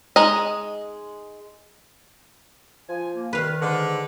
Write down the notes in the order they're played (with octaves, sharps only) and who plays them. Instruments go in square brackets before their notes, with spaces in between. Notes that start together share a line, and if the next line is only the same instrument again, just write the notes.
[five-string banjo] G#3 D#4 D#5
[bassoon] F3 [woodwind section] G#5
[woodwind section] A#3
[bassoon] C2 [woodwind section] D#3 [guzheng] B4 F5
[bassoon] G#2 [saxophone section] D3